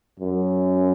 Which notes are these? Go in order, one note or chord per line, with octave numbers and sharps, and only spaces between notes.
F#2